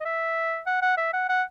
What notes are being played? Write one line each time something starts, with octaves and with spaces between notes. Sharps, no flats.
D#5
E5
F#5
F#5
E5
F#5
F#5